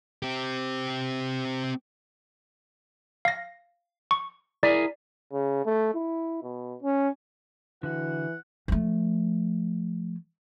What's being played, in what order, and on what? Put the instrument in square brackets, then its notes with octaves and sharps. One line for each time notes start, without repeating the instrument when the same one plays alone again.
[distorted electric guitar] C4 G4
[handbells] F5 A#6
C#6
[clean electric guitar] E4 G#4 A#4 [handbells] D5
[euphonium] C#3
A3
E4
B2
C#4
[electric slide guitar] D3 F#4 [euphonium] E3 [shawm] F#5
[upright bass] F3 A3